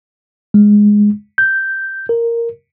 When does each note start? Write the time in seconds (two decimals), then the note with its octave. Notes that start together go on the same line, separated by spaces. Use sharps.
0.54 G#3
1.38 G6
2.09 A#4